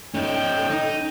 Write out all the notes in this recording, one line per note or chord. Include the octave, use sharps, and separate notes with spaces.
C#4 D#4 A4 G5
D#4